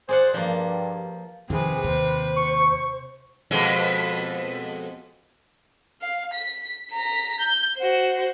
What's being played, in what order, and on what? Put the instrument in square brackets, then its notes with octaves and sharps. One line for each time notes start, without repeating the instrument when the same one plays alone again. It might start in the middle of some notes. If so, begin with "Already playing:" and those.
[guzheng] G#4 D5 F#5 [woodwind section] C5
[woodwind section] G2 [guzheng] F3 A#3
[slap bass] F2 D#3 F3 [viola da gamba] C3 B4 [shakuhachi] G#4
[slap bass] D#2 [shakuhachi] C5
[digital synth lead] C#6
[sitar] F2 B2 G#3
[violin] F5
B6
A#5 B6
G6
F#4 C5